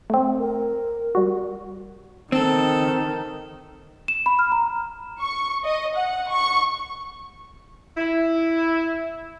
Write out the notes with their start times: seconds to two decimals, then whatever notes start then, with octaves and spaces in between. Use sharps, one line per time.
0.10 A3 C4
0.39 A#4
1.15 G3 F#4
2.32 D#3 C4 A4
4.08 E7
4.26 B5
4.39 F6
4.52 A#5
5.21 C#6
5.64 D#5
5.95 F#5
6.30 C#6
7.97 E4